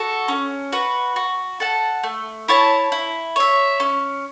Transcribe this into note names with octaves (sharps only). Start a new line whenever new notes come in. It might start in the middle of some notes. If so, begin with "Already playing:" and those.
Already playing: F#4 A4
C#4
F#4 B4
F#4
A4 F#5 A5
A3
E4 C#5 A5
E4
C#5 E5
C#4